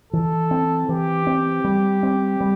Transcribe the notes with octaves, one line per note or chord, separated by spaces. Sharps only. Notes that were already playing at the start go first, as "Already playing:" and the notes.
E3 A4
C4
E3 G4
C4
G3
C4
G3